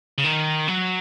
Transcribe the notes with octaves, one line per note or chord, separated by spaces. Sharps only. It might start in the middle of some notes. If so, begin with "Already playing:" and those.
C#3
D#3
F#3